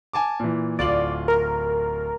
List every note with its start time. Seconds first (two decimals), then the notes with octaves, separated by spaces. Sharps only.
0.13 G#5 A5 D6
0.40 A#2 E3
0.79 D1 F4 D5 F#7
1.28 A#4